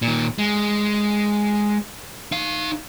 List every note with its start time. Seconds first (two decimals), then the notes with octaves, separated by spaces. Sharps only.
0.02 A#2 D#3
0.39 G#3
2.32 D#4 F5